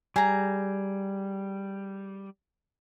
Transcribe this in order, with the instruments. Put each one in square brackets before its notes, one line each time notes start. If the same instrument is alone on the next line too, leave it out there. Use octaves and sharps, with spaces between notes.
[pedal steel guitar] G3 [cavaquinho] G#4 A#5